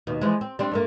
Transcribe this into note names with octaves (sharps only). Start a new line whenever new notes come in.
D#2 B2
E3 F3 G#3
C4
G3 C4 D4
G2 A3 A#3